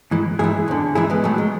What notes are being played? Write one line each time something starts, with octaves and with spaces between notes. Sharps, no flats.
G#2 E3
G#2 E3 E4 G#4
E2 D3
G#2 E3 E4 G#4
G#3 B3
A2 E3 F#3 A3
G#3